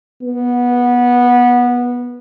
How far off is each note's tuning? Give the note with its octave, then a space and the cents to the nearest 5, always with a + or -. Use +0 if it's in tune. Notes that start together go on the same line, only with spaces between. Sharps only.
B3 -15